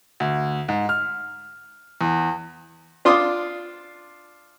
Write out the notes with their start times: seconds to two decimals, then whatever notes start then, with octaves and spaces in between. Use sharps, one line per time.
0.20 D2
0.69 G#2
0.89 F6
2.01 E2
3.05 D4 F4 C6 D6 D#6